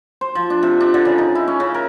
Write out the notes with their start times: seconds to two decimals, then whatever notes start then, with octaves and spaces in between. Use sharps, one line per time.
0.21 C5
0.35 F3
0.50 D4
0.63 C3
0.80 D4
0.94 D3
1.05 C#3
1.18 D#4
1.35 E4
1.48 C#4
1.60 C#3
1.74 A#4